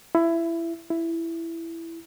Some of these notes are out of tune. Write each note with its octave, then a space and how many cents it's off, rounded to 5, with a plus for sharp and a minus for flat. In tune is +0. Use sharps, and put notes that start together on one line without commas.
E4 +20
E4 +10